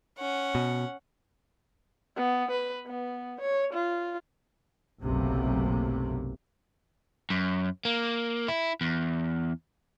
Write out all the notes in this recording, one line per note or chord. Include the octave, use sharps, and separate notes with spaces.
C#4 F#5
B2
B3
B4
B3
C#5
F4
F#1 B1 C3 A3 A#3
F#2
A#3
E4
E2